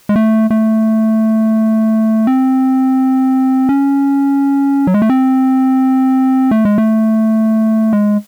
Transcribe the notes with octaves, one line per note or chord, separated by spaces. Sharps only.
G#3
A3
A3
C4
C#4
F#3
G#3
A3
C4
A3
G#3
A3
G#3